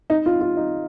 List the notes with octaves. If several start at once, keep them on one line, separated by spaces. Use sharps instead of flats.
D#4
F4
F4
D#4